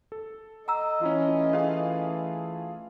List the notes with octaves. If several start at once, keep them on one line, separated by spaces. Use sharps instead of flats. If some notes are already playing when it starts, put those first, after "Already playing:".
A4
D#5 F#5 A#5 E6
E3 A3 C#4 E4 F4
C#4 F4 G#4 F5